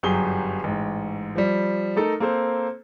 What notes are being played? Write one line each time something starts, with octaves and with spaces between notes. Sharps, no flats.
G1 F#2 F#3 G4 G#4 G7
A1 G#2
F3 G3
A3 D#4 A4 A#4
A#3 C4 A4 C5